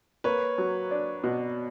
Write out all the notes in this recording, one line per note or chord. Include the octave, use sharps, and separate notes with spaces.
A#3 B4 C#5
F#3
D4
B2